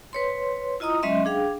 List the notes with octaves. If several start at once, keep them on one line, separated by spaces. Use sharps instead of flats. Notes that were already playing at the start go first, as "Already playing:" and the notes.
B4 C#5 C6
E4 F4 D#5 A#5 D#6
F#3 G#3 C#4 D#5 E5 C6
D4 G#4 F5 G5